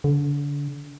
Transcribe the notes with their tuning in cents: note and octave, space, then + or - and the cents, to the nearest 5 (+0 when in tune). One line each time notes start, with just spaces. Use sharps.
D3 -35